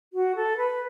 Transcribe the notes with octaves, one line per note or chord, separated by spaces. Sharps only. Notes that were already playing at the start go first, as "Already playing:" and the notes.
F#4
A4
B4